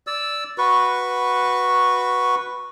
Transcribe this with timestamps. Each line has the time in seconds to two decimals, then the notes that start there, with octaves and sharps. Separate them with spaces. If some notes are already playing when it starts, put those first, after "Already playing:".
0.07 D5 E6
0.58 F#4 B4 C#6